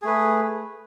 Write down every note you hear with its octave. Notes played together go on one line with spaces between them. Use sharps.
A3 G#4 B4